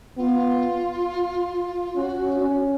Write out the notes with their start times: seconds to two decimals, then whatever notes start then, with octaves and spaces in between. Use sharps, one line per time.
0.17 B3 F4
1.96 C#4 F#4
2.41 C#4